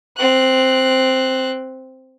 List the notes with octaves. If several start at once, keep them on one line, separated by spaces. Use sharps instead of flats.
C4 F#6